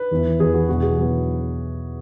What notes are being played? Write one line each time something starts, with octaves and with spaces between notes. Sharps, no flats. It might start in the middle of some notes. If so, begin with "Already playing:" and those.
Already playing: B4
E2 E3 B3 E4
E2 E3 B3 E4 G#4
F#4
E2 B2 F#3 B3 E4 F#4
G#4
E2 B2 F#3 B3 E4